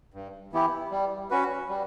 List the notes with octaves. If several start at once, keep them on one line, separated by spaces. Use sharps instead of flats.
G2
E3 B3 E4 G4
G3
C#4 F#4 B4
G3